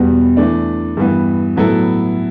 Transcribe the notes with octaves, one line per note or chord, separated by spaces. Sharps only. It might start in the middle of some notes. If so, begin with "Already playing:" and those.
Already playing: E2 B2 G3 B3 F#4
E3 A3 D4
G2 E3 B3
A2 F#3 B3 E4 A4